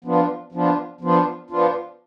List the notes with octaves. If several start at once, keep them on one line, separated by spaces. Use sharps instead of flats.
F3 B3 D4 F4
F3 B3 D4 F4
F3 B3 D4 F4
F3 B3 D4 F4